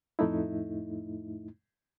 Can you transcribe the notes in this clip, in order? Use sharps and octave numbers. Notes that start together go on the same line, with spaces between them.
F2 A2 A3 D#4 E4